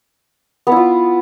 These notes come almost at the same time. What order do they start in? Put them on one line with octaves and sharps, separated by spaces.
B3 E4 F4